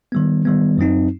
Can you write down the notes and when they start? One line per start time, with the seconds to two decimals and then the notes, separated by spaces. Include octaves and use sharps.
0.12 D#3 G3 B3
0.45 D#3 G3 B3
0.78 F#2 F#3 C4 D#4